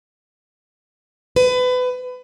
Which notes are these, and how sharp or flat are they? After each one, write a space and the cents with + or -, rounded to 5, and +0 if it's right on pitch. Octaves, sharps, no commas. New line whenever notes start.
B4 +30